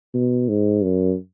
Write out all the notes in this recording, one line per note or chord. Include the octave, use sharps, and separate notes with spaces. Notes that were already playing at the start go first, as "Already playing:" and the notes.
B2
G#2
F#2